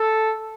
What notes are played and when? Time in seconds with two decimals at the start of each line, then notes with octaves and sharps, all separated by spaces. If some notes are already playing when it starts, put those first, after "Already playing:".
Already playing: A4